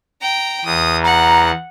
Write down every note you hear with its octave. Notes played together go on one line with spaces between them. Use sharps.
G5 A#5
E2 D#6
F#5 A#5